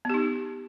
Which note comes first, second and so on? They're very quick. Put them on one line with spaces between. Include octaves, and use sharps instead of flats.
B3 G4 D#4